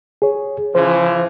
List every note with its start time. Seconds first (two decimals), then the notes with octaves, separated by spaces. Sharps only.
0.22 G#4 C#5
0.75 C#3 E3 F3 C5